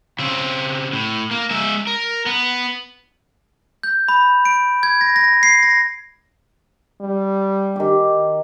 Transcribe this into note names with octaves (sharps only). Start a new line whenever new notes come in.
C#3 C4
A2
A#3
G#3 E5
A#4
B3
G6
B5
D7
G#6
A#6
A#6
C7
A#6
G3
D#3 G4